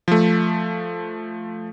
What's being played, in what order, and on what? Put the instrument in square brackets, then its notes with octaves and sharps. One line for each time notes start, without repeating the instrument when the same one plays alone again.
[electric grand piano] F3 A3